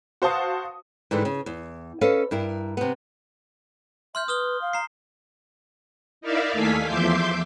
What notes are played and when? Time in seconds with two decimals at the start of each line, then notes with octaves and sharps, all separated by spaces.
0.22 F#4 C5 F5 A5 D#6
1.11 G#2 D3 E3 G3
1.25 C#3
1.46 E2
2.01 C#4 A4 B4 D#5 F5
2.31 G2 E4 A#4
2.77 C3 B3
4.15 E5 C6 F6 G6
4.28 B4 D#6 F6 G7
4.62 F5
4.73 A#5 C7
6.21 D#4 E4 A#4 D5 E5 F5
6.53 D#2 A3 A4 F5 G#5 B6
6.85 E2 F3 E5 C6 D6 G6